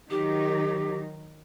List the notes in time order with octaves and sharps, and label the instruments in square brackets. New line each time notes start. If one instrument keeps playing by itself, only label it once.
[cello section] D#3 F#3 D#4 [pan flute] G4